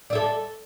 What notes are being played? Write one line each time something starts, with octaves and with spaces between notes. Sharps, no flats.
A4 D5 E5